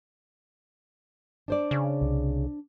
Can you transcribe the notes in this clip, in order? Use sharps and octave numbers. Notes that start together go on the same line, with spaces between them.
D4 C5 D5
C#3
C2